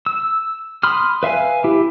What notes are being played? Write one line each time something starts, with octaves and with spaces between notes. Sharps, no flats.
E6
B5 C6 D#6 F6
B4 E5 F5 G#5
E4 G4